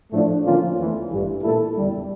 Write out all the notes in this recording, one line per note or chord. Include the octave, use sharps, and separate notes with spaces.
A2 F3 A3 D4
D3 F3 A#3 C#4 F4
E2 E3 A3
A1 G2 E3 G3
A#2 A3 E4 A4
E2 D3 G3